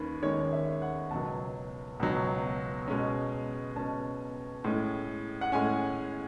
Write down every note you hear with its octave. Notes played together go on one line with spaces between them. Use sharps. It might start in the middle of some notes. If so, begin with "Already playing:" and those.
Already playing: D#2 D#3 C#4 B4
D#2 D#3 G#3 C#4 C#5
E5
F#5
C#2 B2 F#3 A5
C#2 B2 F#3
B2 G#3 C#4
B2 G#3 C#4 A5
A2 G#3 C#4
F#5
A2 G#3 C#4 G#5